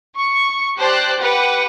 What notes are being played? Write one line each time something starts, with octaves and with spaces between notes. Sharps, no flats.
C#6
G4 C5 D5 A5 F#6
G4 B4 F#5